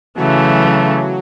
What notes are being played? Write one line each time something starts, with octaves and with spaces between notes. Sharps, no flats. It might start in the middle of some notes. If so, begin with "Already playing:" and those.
C#3 E3 F#3 A3